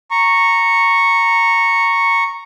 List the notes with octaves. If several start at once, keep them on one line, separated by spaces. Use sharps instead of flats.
A#5 C#6